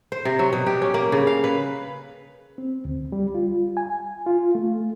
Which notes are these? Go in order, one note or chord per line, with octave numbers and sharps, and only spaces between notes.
C5
C3
F#3
B2
G4
C#4
A#3
C#3
F5
B4
C4
D2
G3
F4
G#5
F4
A3